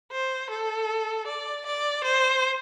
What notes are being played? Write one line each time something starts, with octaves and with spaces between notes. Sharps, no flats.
C5
A4
D5
D5
C5